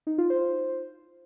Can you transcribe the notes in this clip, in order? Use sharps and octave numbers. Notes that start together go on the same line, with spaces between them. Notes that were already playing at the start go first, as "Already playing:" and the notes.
D#4
F4
C5